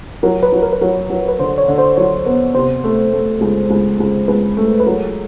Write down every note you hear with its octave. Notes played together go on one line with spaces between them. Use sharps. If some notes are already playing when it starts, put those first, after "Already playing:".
F#3 A#4
B4
F#3
A#4
B4
F#3 A#4
F#3
B4
D3 C5
C#5
D3
C5
F#3 C#5
B3
C3 C5
A3
A3
C#2
C#2
C#2
C#2 B4
A3
B4
F#3 A#4